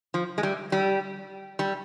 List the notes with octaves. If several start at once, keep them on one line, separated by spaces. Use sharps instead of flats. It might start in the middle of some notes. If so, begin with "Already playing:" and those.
F3
G#3
G3
G3
G3